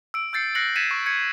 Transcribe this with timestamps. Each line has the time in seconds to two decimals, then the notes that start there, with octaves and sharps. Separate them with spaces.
0.14 E6 D7
0.33 E6 G6 A6 C7 C#7
0.55 F#6 A#6 C7 C#7 F#7
0.76 G#6 A6 B6 C#7 D#7 E7
0.91 C#6
1.06 G#6 C#7